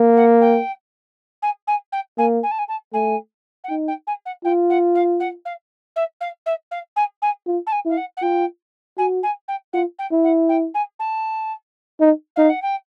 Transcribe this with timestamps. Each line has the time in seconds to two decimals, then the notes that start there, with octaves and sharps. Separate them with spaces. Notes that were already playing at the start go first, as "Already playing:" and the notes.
Already playing: A#3
0.16 F#5
0.41 G5
1.42 G#5
1.67 G#5
1.92 G5
2.18 A#3 G#5
2.43 G#5
2.51 A5
2.58 G#5
2.68 A5
2.93 A3 G#5
3.64 F#5
3.69 D#4 G5
3.88 G5
4.07 G#5
4.25 F#5
4.44 F4 G5
4.70 F#5
4.95 F5
5.20 F#5
5.45 F5
5.96 E5
6.20 F5
6.46 E5
6.71 F5
6.96 G#5
7.22 G#5
7.47 F4
7.66 A5
7.72 G#5
7.85 E4 F5
7.97 F#5
8.17 F#5
8.22 F4 G5
8.98 F#4 G#5
9.23 G#5
9.48 G5
9.73 F4 F#5
9.98 G5
10.11 E4
10.24 F#5
10.49 G5
10.74 G#5
10.99 A5
12.00 D#4
12.36 D#4 F5
12.49 F#5
12.62 G5